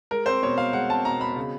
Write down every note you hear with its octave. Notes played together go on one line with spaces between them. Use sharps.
G#3 A#4
C4 C5
B2 C#5
B2 F5
G#3 F#5
C4 A5
B2 A#5
B2 B5
C#3